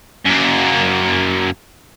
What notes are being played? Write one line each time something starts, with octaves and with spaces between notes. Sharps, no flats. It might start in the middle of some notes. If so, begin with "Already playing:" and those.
F#2 A#3